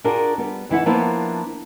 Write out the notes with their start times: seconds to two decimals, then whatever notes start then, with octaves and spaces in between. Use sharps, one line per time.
0.04 D4 F4 F#4 G#4 A#4 D5
0.38 G3 B3
0.69 F2 E3 E4 F#5
0.86 F3 A#3 B3 D4 E4